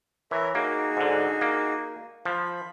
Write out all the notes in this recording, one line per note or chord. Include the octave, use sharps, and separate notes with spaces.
E3 A#4 C#5 E5
A#3 D#4 F#4 G#4
G#2 D3
A#3
F3 B5